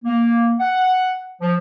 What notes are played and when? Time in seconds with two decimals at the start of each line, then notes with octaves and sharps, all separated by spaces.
0.05 A#3
0.60 F#5
1.41 F3